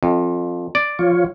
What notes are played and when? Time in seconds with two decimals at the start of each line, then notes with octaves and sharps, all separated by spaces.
0.03 F2
0.75 D5
0.99 F3 F4 C#5